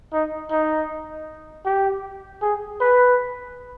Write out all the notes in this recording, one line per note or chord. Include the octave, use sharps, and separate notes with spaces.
D#4
D#4
G4
G#4
B4